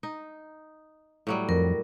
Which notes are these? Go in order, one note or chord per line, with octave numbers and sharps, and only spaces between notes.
D#4
A2 F#3 G3
F2 A#4